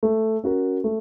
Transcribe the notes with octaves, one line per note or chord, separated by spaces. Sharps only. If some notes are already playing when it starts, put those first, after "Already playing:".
A3
C#4 F#4 A#4
A3